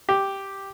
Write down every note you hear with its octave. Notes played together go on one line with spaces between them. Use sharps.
G4